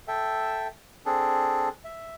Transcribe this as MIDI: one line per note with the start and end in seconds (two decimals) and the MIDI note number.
0.08 0.67 69
0.08 0.67 76
0.08 0.67 79
1.06 1.69 60
1.06 1.69 62
1.06 1.69 68
1.06 1.69 69
1.85 2.15 76